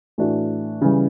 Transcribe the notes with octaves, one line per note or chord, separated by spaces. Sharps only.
A2 E3 A3 D4 F#4
C#3 E3 G3